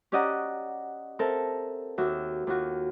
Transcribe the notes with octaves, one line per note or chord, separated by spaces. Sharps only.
C#4 G4 D5 D#5 F#5 A#5
C4 A4 A#4 E5
D#2 F#4 E5 E6
D#2 F4 F#4